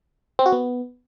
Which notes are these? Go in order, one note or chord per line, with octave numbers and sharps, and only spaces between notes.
C4
F#4
B3